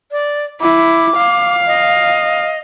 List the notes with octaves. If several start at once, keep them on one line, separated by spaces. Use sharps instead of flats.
D5
E4 D6
F5
D#5